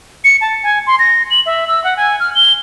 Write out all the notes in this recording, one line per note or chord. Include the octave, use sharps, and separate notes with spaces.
C#7
A5
G#5
C6
A#6
F#7
E5
E6
F#5
G#5
F6
G7